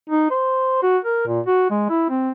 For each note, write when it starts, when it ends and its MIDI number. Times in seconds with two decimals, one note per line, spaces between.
0.10 0.29 63
0.30 0.82 72
0.83 0.98 66
1.05 1.26 70
1.27 1.40 46
1.46 1.67 66
1.70 1.88 56
1.89 2.08 64
2.10 2.32 60